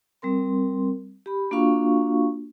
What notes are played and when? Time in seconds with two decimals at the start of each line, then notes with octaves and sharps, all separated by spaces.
0.22 G3 C4 A#4 C6
1.26 G4 B5
1.51 A#3 D4 F4 F#4 F5 C#6